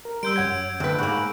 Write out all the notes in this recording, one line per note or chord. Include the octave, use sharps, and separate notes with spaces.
A#4
G3 C6 E6 G6 D7
F#2 C#5 F#5 G#6
D2 B4 G5
G#2 A#3 G#4 B5 C#6 F#6